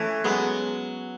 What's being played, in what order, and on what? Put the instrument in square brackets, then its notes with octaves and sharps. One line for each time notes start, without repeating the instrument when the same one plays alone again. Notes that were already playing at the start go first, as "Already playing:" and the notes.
Already playing: [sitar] E3 [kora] A3 C#4
[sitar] F#3 [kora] G#3 B3